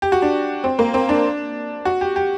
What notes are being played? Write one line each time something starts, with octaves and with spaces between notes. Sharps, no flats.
G4
F#4
D4
C4
A#3
C4
D4
F#4
G4
G4